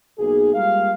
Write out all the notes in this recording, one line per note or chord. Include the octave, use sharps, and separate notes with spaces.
B1 A#3 G#4
G3 G#3 A#3 F4 F5